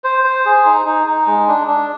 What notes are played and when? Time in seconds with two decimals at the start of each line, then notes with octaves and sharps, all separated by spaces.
0.04 C5
0.24 C5
0.45 G#4
0.65 D#4
0.86 D#4
1.07 D#4
1.27 G#3
1.48 D4
1.67 D4